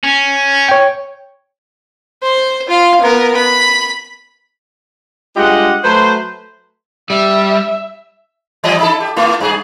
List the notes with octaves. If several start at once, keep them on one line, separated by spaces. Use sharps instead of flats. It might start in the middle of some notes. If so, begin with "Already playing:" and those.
C#4
C#5 G5
C5
F4 F5
B3 A#4
B5
G2 G#3 F4 G4 D#5 F#5
F#3 A3 B4 C5
G3 E5
E3 G3 D#5
D#4 E4 A4
G4
A3 E4 F4
G2 G#4